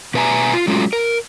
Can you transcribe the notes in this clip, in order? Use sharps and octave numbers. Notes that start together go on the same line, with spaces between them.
B2 B4 E5 G#5 A#5
F4
F#3 G#3 A3 C#4 F4
A#4